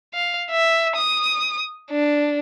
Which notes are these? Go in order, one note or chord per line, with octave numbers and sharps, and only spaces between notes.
F5
E5
D#6
D4